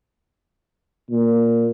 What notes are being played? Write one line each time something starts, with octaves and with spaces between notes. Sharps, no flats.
A#2